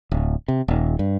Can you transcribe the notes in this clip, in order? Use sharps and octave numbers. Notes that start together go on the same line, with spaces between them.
D1
C3
D#1
G2